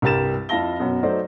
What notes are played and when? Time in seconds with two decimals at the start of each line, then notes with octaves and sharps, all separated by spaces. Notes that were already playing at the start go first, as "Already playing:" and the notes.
0.02 C2 G2 G4 A#4 A6 E7
0.49 F2 E4 F5 A5 A#6 G7
0.80 F#2 B2 F#5
1.03 F#3 A3 D#4 C5 D5